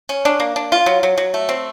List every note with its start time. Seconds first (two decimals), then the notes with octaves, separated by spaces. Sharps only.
0.09 C#4
0.25 D4
0.40 A#3
0.56 D4
0.72 F4
0.86 F#3
1.03 F#3
1.18 F#3
1.34 A3
1.49 C4